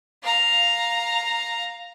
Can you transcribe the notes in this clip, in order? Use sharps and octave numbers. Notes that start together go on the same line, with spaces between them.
F5 A#5